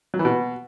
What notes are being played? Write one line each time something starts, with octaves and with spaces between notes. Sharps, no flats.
F#3
E3
B2